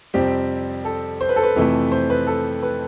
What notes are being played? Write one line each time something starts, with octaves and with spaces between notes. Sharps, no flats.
F2 C3 G3 C4 G4
A4
C5
B4
A4
B4
F2 C3 E3 A3
C5
B4
A4
B4